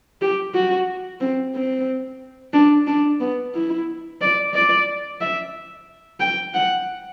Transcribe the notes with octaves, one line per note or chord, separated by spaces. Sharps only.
G4
F#4
C4
C4
D4
D4
B3
E4
D5
D5
E5
G5
F#5